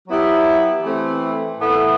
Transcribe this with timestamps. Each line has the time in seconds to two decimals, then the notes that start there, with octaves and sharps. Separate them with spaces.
0.08 F#3 B3 E4 G4
0.82 E3 A3 C4
1.58 A2 E3 B3 E4 A4